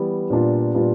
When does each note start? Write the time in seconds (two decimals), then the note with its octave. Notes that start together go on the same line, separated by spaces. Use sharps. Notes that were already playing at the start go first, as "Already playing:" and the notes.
Already playing: E3 G3 B3
0.30 A#2 G3 B3 D4 F4
0.74 A#2 G3 B3 D4 F4